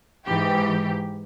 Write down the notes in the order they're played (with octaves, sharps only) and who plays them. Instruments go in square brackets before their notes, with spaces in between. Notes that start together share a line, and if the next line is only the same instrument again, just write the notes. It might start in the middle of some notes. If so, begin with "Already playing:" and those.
[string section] G#2 E3 G4